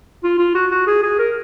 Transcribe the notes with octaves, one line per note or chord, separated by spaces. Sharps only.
F4
F4
F#4
F#4
G#4
G#4
A#4